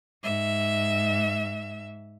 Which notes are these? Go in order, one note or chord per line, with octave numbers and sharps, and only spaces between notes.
G#2 E5